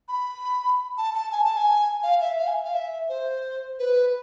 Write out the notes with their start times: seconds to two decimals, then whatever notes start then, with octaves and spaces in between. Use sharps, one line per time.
0.08 B5
0.98 A5
1.15 A5
1.32 G#5
1.44 A5
1.57 G#5
2.03 F5
2.21 E5
2.38 F5
2.47 G#5
2.65 F5
2.74 E5
3.09 C5
3.79 B4